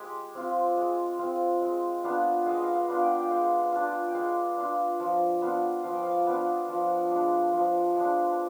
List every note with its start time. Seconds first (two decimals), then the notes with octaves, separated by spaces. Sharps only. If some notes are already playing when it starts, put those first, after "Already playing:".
Already playing: G#3 G4
0.35 C4 F4
0.77 G#3
1.19 C4 F4
1.61 G#3
2.04 B3 D4 F4
2.46 G#3 F5
2.55 D#5
2.64 F5
2.74 F5
2.88 B3 D4 F4
3.02 G5
3.20 G5
3.31 G#3 F5
3.59 F5
3.72 D4 F4
3.87 G5
4.08 G5
4.15 G#3 F5
4.58 D4 F4
5.00 F3
5.42 B3 D4 F4
5.83 F3 F5
5.94 G5
6.03 F5
6.26 B3 D4 F4
6.68 F3
7.11 G#3 D4
7.53 F3
7.96 G#3 D4